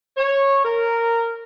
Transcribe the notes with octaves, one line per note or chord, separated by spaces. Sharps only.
C#5
A#4